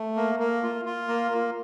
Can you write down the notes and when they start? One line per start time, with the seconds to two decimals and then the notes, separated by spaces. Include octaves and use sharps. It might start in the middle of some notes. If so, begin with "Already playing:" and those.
Already playing: A3
0.16 A#3
0.40 A#3
0.63 F4
0.85 F4
1.08 A#3
1.31 A#3